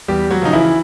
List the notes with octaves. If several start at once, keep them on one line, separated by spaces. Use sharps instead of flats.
E2 G3 G4
F#3 F#4
C#3 F3 D#4
E3 E4